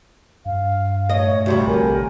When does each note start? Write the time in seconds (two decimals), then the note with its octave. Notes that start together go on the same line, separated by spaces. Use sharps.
0.45 G2 F5
1.09 A#2 A3 C#5 D#5
1.46 D2 C3 G3 F#4
1.67 A#1 D3 A#4 G#5